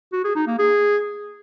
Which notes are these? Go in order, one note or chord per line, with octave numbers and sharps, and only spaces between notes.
F#4
G#4
D#4
A#3
G#4